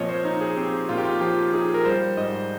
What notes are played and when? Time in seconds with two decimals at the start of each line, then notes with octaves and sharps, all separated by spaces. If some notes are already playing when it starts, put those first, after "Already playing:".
Already playing: A#2 F3 C4 C#5 D#5 F5
0.09 C5
0.25 D#4
0.41 G#4
0.57 C4 G4
0.89 A#2 F4
0.98 G4
1.05 F4
1.21 F3 G4
1.53 D#4 G#4
1.74 A#4
1.85 G3 C5
2.17 G#2 D#5